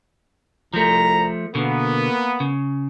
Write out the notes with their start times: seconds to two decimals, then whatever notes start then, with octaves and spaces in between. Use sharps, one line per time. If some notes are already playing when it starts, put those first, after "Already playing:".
0.74 C2 F3 A3 A#5
1.55 B2 D3 A#3 B3
2.40 C#3